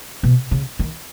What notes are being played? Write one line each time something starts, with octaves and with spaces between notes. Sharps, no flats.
B2
C#3
D#3